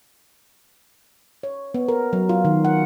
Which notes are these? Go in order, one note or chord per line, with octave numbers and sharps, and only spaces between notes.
C#5
B3
A#4
F#3
F4
D#3
F#5